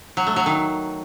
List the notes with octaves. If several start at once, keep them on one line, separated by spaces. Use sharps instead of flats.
F#3
A3
F#3
D#3